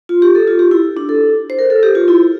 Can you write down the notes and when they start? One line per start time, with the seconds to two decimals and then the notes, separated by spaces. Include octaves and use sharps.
0.09 F4
0.22 G4
0.35 A4
0.47 F4
0.59 G4
0.71 E4
0.97 D4
1.09 A4
1.50 C5
1.59 A#4
1.70 A4
1.83 G4
1.95 F4
2.08 E4